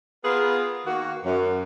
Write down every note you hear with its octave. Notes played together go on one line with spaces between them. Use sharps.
B3 F4 G#4 A#4 B4
D#3 A#3 F#4
F#2